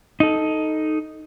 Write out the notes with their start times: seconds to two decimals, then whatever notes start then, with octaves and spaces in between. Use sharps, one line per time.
0.20 D#4 A4